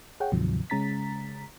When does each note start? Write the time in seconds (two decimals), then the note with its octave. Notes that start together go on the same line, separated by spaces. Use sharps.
0.20 G#4 C#5 F#5 G5
0.32 D2 G#2 C3 D#3 F3 F#3
0.70 C#3 G#3 C#4 A#5 A6 B6